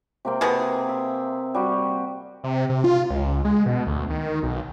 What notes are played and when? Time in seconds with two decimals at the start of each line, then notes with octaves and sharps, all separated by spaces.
0.25 C3 A#3 C4
0.41 B2 G#4
0.89 E5
1.54 G3 F#4
2.44 C3
2.70 C3
2.84 F4
3.10 C#2
3.45 G#3
3.66 B2
3.87 D2
4.10 D#3
4.43 B1